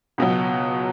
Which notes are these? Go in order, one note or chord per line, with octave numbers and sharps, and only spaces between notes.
C#2 B2 F#3